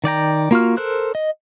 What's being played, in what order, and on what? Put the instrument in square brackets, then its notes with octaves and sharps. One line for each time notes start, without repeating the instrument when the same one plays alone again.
[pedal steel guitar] D#3 D5 G5 A#5
A#3 F4 F#4 F6
A4 A#4 C5 F#6
D#5